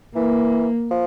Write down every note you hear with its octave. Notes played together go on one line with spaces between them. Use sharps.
E3 A#3
F3